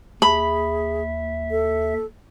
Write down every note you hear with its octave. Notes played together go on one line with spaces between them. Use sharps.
D#2 G#4 E5 B5
A4